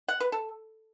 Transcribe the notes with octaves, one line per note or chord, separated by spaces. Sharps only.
F#5
B4
A4